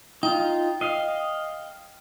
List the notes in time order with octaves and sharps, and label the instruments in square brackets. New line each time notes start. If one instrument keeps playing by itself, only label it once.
[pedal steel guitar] D#4 F4 [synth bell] G5
[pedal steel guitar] D#5 F5